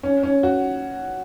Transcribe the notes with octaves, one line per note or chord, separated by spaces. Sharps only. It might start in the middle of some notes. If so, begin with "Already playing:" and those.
C#4
C#4
F#4